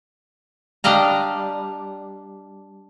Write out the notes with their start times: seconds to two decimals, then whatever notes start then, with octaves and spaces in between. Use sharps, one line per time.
0.84 G3 D4 D5 D#5 F5 A#5